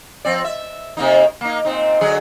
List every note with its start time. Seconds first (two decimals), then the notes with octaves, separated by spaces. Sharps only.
0.25 F3 C4 D5
0.44 E5
0.97 C3 A#3 D#4
1.41 A#3 D#4
1.65 A#2 C4 D#4
2.01 D3 F#3 G#4